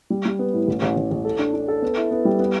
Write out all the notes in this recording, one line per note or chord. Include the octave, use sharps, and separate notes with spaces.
G3
G3
B3
A2
A1
A1
A1
A1
A4
D4
D4
A4
B3
E4
B3
G3
B3